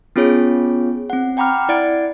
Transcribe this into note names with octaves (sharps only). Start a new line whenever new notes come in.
B3 C#4 F4 G#4 C#5
C4 F#5
F#5 G5 A#5 B5 D6 F6
E4 D5 F#5 A6 D7